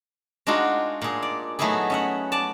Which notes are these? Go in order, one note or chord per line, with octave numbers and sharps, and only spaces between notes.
G#3 D4 D#4 F4 F#4 G#4
A#2 G#4
D5
F#3 A3 B3 D#4 E4 G#4
C#4 E5 F#5
D5 A5